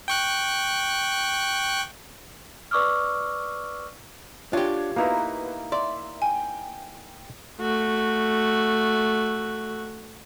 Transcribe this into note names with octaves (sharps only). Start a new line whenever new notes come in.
G5 C#6 F#6
B4 D5 C#6 D6 E6 F6
D4 F4 G4 C#5
A#3 B3 D#4 E4 F#4 B4 F5 A#5
D5 E5 C6
G5 G#5
A3 F#4